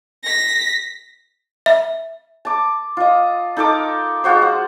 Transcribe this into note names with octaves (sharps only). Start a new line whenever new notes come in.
A#6 B6
E5
A5 D6
F4 D#5
D#4 A4 A#4 D6
G#3 F4 F#4 C5
F#5